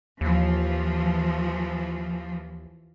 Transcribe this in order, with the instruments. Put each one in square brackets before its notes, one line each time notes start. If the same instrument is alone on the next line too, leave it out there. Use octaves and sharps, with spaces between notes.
[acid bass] D#2 [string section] E3 F3